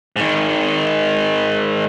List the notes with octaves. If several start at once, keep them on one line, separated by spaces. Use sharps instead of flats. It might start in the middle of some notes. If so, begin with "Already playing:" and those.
G#2 D#3